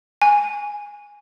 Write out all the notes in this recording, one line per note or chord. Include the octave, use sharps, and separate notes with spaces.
G#5